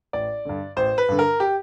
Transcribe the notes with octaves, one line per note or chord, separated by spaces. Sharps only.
A1 D5
G2 D3
A1 C5
B4
G2 D3
A#4
G4